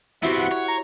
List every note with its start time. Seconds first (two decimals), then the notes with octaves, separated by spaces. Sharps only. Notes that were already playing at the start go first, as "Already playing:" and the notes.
0.23 B3 C4 E4 F#4 G4 E5
0.37 F#5
0.51 C#5
0.68 A#5